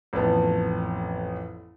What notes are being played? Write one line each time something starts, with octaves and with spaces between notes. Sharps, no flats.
A1 F2 B3 A5